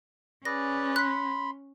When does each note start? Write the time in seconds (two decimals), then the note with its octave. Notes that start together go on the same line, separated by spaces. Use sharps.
0.45 C#4 G#4 B4 D5 A#6
0.96 B5 C6 F#6 B6